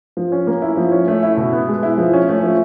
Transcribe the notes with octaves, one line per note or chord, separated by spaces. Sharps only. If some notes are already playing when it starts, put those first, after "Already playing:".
F3
C#4
A#3
E4
F3
C#4
A3
E4
B2
B3
G#3
E4
F3
C#4
A3
F3